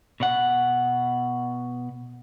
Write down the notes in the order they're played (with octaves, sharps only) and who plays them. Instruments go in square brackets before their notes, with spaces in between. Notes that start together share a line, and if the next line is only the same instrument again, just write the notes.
[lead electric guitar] B2 F#5